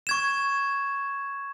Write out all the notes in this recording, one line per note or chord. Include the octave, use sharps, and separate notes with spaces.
C#6 G#6 E7